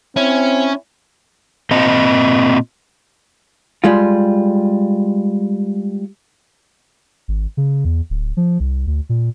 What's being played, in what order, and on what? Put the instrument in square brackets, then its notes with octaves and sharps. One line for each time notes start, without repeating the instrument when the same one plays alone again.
[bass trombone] C4 [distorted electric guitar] C#4 [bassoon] E4
[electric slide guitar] A#2 C4 D#5
[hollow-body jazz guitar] G3 G#3 F4
[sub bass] G#1
C#3
E2
D1
F3
C2
D2
A#2